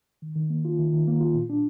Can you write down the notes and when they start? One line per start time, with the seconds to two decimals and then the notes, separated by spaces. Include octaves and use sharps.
0.22 D#3
0.36 D#3
0.50 A#3
0.65 F4
0.79 D#3
0.93 D#3
1.07 A#3
1.21 F4
1.35 A#2
1.50 D4